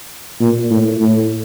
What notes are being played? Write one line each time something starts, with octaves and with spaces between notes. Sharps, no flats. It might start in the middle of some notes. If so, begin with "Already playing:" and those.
A#2
A2
A2